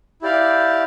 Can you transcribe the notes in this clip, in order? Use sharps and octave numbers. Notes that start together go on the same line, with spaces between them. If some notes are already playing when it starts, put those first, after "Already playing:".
E4 G4 D5 F5